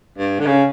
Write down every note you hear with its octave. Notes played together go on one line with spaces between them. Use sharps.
G2
D3
C#3